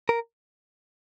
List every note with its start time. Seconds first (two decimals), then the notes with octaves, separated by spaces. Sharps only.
0.09 A#4